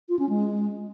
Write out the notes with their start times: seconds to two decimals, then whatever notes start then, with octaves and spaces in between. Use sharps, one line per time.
0.09 F4
0.19 C#4
0.29 G#3